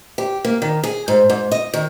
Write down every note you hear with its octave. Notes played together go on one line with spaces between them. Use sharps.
G4
A#3
D#3
G#4
G#2
G#2
D#5
D#3